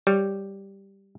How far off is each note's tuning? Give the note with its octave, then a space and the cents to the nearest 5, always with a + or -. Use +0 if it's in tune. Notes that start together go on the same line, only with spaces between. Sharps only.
G3 +0 C#5 +10